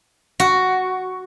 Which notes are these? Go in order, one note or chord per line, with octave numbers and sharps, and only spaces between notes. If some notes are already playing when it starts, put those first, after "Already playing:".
F#4